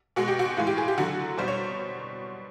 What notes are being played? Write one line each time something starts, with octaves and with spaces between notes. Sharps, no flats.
B2 G#3 F#4
G4
F#4
A2 E3 G#3 F4
G4
G#4
G4
D3 F#3 F#4
B2 G3 C5
C#5